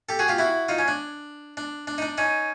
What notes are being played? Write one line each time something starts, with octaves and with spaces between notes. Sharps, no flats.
G4 A4
F#4 G#4
F4 G4
E4 F#4
D#4 F4
C#4
D4
D4
D4
D#4
D4
C#4 D#4